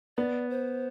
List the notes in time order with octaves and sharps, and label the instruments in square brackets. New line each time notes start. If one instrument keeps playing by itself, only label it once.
[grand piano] B3 [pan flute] D5
[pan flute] C5